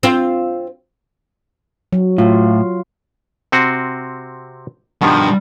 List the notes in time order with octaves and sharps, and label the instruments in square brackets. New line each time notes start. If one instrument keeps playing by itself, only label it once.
[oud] C4 F4
[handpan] F#3
[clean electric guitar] A2 [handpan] F4
[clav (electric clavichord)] C3 C4 F#4
[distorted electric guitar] G2 [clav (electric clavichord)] B2 D#3 F3